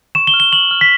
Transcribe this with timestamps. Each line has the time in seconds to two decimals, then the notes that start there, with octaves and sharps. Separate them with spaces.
0.15 C#6 E7
0.27 G7
0.34 F6
0.40 G7
0.52 C#6 F#7
0.71 F6
0.81 B6